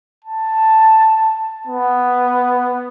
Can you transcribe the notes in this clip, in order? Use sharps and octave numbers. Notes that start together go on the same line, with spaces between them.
A5
B3